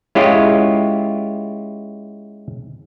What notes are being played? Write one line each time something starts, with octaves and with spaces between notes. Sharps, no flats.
G#3 C#4 E4 F4 G4